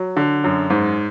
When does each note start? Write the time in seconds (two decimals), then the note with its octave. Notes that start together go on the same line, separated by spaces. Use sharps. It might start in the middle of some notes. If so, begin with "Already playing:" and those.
Already playing: F#3
0.17 D3
0.44 F#2
0.70 G#2